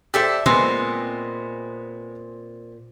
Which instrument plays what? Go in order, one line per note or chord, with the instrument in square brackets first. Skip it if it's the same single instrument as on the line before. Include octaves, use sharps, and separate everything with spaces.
[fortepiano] G4 A4 C5 [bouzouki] D5 E5 A5
[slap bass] A#2 [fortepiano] G#3 B3 [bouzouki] C4